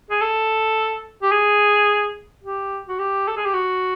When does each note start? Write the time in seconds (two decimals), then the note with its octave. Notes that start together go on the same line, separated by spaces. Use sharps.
0.10 G#4
0.21 A4
1.22 G4
1.31 G#4
2.43 G4
2.88 F#4
2.99 G4
3.28 A4
3.36 G#4
3.45 G4
3.54 F#4